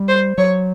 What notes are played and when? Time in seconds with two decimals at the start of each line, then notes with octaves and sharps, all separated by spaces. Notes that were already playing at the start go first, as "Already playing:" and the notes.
Already playing: G3
0.09 C5
0.38 F#3 C#5